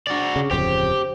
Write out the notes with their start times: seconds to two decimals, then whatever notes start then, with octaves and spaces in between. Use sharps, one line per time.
0.07 D4 F#4 G#4 D5
0.36 C#3
0.51 D1 F2 C#3 G4 C5